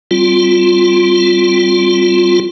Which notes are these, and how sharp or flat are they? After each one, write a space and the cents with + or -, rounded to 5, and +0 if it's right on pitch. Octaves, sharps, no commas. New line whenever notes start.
G3 +0 C4 +0 F4 +5